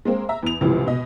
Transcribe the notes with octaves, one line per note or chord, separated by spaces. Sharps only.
G#3 A#3 C4
E5 A#5
E2 F7
C#2 A2 C3 E3 F3
B2 D#5